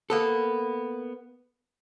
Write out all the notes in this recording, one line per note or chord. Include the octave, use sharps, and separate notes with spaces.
A#3 B3 A4